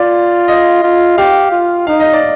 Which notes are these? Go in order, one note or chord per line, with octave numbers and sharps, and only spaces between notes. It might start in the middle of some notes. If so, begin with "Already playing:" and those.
Already playing: F4 D5
D#5
F4
G4 F5
F4
D#4 F5
D#5
D5